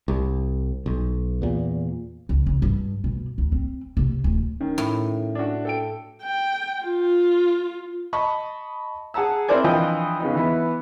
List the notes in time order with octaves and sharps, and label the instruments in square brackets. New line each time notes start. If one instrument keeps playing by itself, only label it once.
[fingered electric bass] C2
B1
E2 A#2
[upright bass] C#2
C#3
G2
B2
D2
C4
C3
D1
[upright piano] D#3 [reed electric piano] C#4
[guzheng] A2
[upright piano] D4 F#4
A4 G5 D7
[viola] G5
F4
[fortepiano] D#5 A5 B5 C#6
G#4 F#5 A5 A#5 E6
C4 E4 A#4 C5 D5 G#5
E3 F3 D4 D#5 G5 D#6
C#3 B3 D#4
E3 B3 E4